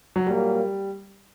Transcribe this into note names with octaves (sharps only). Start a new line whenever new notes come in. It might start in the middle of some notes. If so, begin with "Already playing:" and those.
F#3
A#2 F#3 G3 A#3